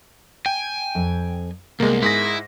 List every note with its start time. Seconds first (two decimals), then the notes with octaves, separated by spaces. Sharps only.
0.46 G5 G#5
0.95 F2
1.80 C2 G#3 A#3 B3 A#4
2.02 G#2 E4 G#4 A#6